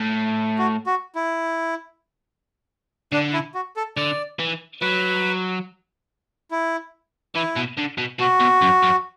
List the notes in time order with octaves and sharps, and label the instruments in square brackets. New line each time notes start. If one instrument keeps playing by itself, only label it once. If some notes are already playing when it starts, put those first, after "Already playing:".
Already playing: [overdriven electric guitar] A2
[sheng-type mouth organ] F#4
F#4
E4
[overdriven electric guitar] D3 [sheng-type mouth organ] D4
[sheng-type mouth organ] E4
F#4
A4
[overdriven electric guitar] D3 [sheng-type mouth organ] D5
[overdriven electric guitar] E3
[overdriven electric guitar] F#3 [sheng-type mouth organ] B4
[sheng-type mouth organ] E4
[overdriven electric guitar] E3 [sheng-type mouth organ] E4
[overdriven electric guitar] B2
D3
B2
[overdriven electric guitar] B2 [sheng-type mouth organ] F#4
[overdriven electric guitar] B2
F#2
F#2